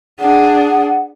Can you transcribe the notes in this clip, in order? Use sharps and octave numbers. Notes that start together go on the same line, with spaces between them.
D4 G#4 F#5